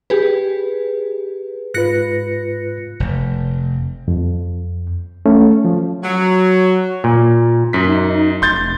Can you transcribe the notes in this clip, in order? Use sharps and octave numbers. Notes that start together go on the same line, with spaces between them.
G4 G#4 B4
G#2 F4 B4 F#6 A#6 C#7
F1
F2
A3 C#4
F3
F#3
A#2
F#2 B6
D#4
F1 C6 G6 A6